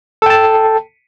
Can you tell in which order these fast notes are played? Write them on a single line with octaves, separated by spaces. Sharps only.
A4 G5 A5